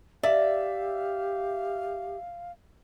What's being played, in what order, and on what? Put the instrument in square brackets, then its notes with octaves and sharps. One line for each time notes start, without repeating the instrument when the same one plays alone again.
[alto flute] G4 [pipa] D5 [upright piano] E5 [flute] F5